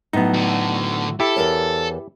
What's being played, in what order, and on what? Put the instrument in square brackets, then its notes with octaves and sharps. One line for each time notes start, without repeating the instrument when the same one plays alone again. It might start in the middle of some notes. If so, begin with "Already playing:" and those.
[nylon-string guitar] A2 F#3 [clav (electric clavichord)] B3 D#4
[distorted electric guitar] D3 F#4
[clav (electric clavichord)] E4 G4 [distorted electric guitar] A4
[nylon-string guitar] E2 A#4 C#5